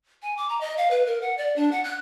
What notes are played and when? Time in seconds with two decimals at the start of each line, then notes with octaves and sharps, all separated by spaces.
0.23 G#5
0.37 D6
0.49 A#5
0.61 D#5
0.77 F5
0.91 B4
1.06 A#4
1.21 F#5
1.38 D5
1.56 D4
1.72 F#5
1.84 F#6